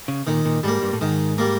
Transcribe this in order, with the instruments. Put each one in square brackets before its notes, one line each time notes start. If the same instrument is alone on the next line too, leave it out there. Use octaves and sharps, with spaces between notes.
[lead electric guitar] C#3
[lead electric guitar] A#2 [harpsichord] D#3
[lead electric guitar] A#2
[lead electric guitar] G#2 [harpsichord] G3 A#3
[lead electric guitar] G2
A2
[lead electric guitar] G#2 [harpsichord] D#3
[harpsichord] G3 A#3